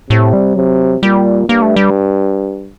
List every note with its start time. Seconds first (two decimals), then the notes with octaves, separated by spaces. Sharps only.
0.10 A2 C3
0.33 G3
0.56 C3 F#3
1.03 A#2 G3
1.49 G2 A#3
1.62 A3
1.76 G3